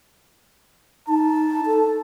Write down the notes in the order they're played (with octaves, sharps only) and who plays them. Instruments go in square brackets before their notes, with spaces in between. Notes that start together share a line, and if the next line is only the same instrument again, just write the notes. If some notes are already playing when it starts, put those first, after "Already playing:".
[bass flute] D#4 [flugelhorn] A5
[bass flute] A4